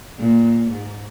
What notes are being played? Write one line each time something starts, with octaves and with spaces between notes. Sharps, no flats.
A#2
G#2